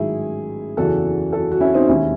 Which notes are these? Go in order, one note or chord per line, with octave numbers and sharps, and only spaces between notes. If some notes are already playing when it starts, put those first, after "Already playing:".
Already playing: A1 G#2 D#3 F#3 E4 G#4
F#1 E2 C#3 E3 F#4 A4
F#4 A4
F#4
C#4 E4
C4 D#4
E1 D#2 D#3 G#3 C#4 E4